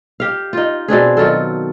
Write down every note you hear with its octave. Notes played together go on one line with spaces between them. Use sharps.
G4 F5
D#4 F4
B2 C4 D4 G#4
D#3 F#3 F4 A4